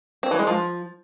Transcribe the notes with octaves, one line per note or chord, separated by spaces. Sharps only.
C4
E3
G#3
F3